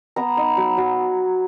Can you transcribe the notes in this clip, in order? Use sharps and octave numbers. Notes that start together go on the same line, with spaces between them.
B3 A#5
D#4
F#3
F#3